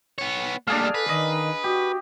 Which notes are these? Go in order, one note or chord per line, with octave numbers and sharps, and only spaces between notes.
B3 C#5
G3 A3 A#3 D4 G#4 F5
A4 B4
D#3 D#5
F#4 G4